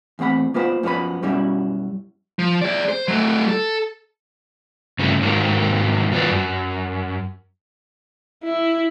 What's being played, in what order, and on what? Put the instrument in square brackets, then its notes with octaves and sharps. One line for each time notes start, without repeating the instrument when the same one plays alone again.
[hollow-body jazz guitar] E2 A2 C4 F#5 B5
A#3 B3 F4 B4 C5 F#5
F#2 F3 G3 B3 C#5 B5
F#2 B2 G3 C#4 E4 F#4
[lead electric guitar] F3
G#4 D5
C5
F#3 A3
A4
[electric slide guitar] G2 C#3 F3 G3 A3
G#2 D#3 F#3 A#3
D#3 F#3 G3 F4 B4 D5
F#2
[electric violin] E4